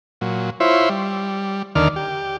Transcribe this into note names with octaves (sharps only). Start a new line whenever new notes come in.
A#2 F#3
E4 F4 C5 C#5 E5
G3
D#2 D3 D#3 D5 F6
G4